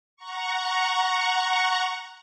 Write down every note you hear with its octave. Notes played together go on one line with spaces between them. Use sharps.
F#5 A#5 C#6